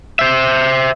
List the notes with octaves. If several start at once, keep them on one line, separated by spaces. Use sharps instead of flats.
C5 E5